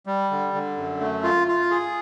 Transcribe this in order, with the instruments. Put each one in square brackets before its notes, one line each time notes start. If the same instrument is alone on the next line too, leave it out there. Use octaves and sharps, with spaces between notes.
[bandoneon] G3
D3
D3
F#2
A3
F4
F4
G#4